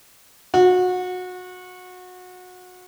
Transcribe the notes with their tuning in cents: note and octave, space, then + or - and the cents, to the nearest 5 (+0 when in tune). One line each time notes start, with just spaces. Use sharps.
F#4 -25